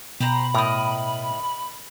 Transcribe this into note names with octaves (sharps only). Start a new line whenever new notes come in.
B2 G4 C5 A#5 B5
A2 A#4 D#5